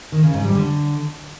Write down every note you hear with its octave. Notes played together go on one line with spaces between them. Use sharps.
D#3
C#3
G#2
G3
D3